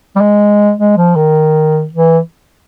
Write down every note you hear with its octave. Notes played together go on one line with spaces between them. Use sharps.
G3
G#3
G#3
F3
D#3
E3